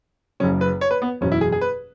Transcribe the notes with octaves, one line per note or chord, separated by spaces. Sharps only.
F#1 F#2 C#3 C#4
B4
C#5
B4
B3
F#1 E2 B2 C#4
E4
G#4
G#4
B4